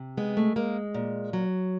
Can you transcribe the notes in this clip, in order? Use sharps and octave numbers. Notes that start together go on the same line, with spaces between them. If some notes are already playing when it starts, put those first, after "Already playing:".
Already playing: C3
G#3 B3
A3
G#3 A#3
A#2
F#3